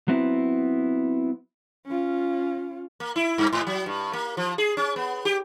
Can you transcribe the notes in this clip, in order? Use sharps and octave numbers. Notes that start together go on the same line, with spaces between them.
F#3 B3 C4 E4
C#4 F4
A#3
E4
G2
G#2
F#3
G2
A#3
F3
G#4
C#4
B3
G4